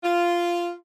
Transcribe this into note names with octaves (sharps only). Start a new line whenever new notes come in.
F4